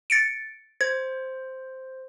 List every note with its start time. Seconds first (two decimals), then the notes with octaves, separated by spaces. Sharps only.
0.10 A6 C#7 D7
0.81 C5 G#6